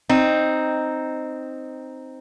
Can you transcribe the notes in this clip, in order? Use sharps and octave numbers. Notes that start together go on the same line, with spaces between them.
C4 D#4